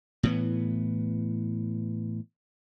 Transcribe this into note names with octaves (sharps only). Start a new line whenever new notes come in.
A2 E3 B3